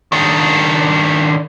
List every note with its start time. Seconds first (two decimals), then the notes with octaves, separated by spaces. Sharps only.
0.12 D#3 D4